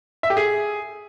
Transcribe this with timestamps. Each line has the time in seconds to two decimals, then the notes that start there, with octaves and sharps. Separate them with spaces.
0.23 E5
0.30 G4
0.37 G#4